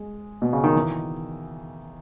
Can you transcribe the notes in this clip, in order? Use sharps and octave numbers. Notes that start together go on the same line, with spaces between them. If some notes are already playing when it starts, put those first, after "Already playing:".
Already playing: G#3
B2
C#3
D#3
E3